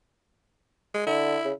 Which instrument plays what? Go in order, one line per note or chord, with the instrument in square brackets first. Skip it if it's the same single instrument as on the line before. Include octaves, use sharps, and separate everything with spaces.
[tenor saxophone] G#3
[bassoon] D3 [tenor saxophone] E4
[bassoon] C#3